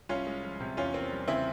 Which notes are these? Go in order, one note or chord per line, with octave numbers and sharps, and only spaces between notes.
C2 C#4 F4
G#3
F3
C3
E2 C#4 F4
A#3 C4
G3
C#3 C4 E4